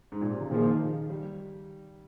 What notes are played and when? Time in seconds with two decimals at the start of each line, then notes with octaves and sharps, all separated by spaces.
0.12 G#2
0.21 A#2
0.31 C3
0.41 C#3
0.49 A#2 D#3 F3 A#3 D#4 G#4
1.10 G3